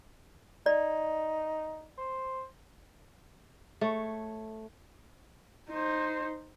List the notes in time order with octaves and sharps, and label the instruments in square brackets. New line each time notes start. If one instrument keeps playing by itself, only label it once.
[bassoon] D#4 [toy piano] D5
[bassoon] C5
[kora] A3 C#5
[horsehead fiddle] D#4 C5